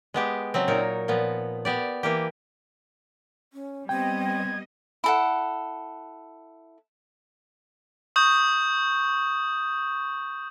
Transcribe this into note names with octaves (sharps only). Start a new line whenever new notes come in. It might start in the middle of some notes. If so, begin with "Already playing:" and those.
G#3 B3 G4
C#3 F#3 C4
A#2 D#4 A#4 C#5
A#2 F3 B3
B3 G4 D5
E3 A#3 G4
C#4
G3 B3 C4 D#5 G5 G#6
G#6
E4 A4 F#5
C#6 D#6 G6